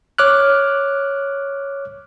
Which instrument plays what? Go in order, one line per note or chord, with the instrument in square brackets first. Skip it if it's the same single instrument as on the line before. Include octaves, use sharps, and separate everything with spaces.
[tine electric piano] C#5 D6 F6 F#6